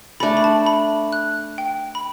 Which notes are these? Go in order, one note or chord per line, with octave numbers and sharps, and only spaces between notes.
A3 D4 A4 B5
B5
A5
B5
F#6
G5
B5